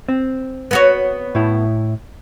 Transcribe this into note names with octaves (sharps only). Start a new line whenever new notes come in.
C4
B3 F#4 C#5
A2 E4